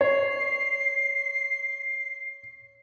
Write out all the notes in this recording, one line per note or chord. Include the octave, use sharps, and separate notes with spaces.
C#5 C7